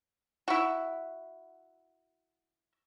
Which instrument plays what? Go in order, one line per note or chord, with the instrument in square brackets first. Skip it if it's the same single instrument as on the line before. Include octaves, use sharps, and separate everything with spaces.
[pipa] E4 F#4